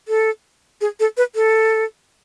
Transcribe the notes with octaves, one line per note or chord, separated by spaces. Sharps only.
A4
G#4
A4
B4
A4